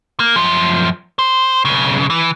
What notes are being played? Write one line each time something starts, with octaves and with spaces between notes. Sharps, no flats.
A#3
F#2 F3
C5
B1 C#3
E3